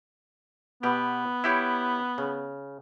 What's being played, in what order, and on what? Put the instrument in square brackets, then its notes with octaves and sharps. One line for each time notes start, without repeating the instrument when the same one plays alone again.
[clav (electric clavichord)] B2 G4 [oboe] B3
[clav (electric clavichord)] E4 G4 C#5
C#3